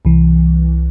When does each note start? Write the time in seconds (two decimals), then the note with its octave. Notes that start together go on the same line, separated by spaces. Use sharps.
0.05 C2 E3